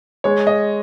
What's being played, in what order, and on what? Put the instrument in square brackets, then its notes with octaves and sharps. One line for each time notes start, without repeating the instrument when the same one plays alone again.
[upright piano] G#3 [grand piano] C#5
[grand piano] D#5